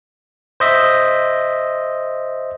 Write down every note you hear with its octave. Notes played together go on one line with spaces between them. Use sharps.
C5 D#5 E5